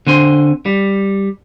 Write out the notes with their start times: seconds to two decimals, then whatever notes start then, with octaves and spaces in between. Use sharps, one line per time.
0.07 D3 C4 G#5 C6
0.66 G3